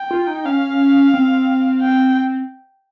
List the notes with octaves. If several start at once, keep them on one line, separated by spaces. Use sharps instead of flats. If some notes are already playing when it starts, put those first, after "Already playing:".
Already playing: G5
F4
D#4
C#4 F5
C4
G5